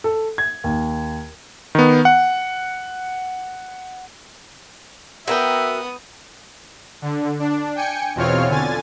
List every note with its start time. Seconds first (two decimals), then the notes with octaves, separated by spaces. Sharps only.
0.04 A4
0.38 G#6
0.64 D#2
1.75 D#3 B3
2.05 F#5
5.27 B3 F#4 A#4 E5 G5 D#6
7.02 D3
7.39 D4
7.75 G5 G#5 C#7
8.15 E2 B2 C4 F4 C#5 F6
8.49 D3 G#5 A6